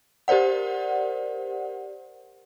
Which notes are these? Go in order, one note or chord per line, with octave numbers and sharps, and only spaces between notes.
G4 A#4 C5 D5 F#5